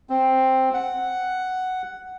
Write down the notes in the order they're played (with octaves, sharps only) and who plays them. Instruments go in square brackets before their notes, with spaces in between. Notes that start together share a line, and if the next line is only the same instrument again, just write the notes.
[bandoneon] C4
F#5